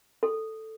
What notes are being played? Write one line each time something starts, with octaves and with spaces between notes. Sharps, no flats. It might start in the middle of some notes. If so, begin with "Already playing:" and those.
A4